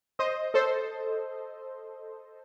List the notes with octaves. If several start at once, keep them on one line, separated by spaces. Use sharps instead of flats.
C5 D#5
A4 C5